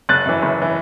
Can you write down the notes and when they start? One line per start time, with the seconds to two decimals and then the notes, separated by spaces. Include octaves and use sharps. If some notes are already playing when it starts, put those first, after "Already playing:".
0.09 F#1 F#6 A6
0.26 F#2 E3
0.42 F#1
0.62 E3